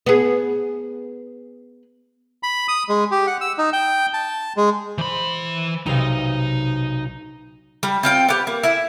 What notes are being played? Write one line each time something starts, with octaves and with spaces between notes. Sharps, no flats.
B3 G#4
B5
D#6
G#3
G4
F#5
E6
D#4
G5
A5
G#3
E3 C5 B5
B1 C3 D#4 F5
G3
C4 F4 G5
B3 G4
A#3
E4 E5